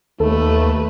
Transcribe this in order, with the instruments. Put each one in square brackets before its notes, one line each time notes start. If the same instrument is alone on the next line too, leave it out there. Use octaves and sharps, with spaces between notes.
[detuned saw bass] D#2 [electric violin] A3 B4 [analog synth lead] A4